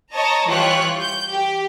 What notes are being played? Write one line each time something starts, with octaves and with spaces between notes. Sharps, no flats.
C#5 D#5 A5 A#5
E3 G3 F4 G4 C#5 F#6
G6
G4